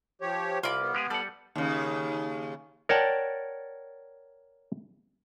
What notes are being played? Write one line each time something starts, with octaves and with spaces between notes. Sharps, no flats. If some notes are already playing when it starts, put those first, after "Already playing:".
F3 G4 C#5
C2 F4 B5 D6
B3
G#3 G4 G#4
G3 A4 D5 F#5
D#2 C#3
A#4 C#5 D5 F#5 G5 A5